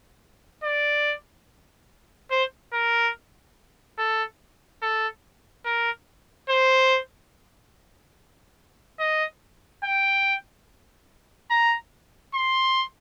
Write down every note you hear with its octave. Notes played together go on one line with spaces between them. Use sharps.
D5
C5
A#4
A4
A4
A#4
C5
D#5
G5
A#5
C6